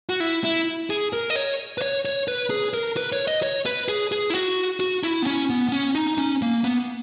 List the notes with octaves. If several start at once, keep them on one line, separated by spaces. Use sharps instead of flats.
F#4
E4
E4
G#4
A#4
D#5
C#5
B4
C#5
C#5
B4
G#4
A#4
B4
C#5
D#5
C#5
B4
G#4
G#4
E4
F#4
F#4
E4
B3
C#4
B3
B3
C#4
D#4
C#4
A#3
B3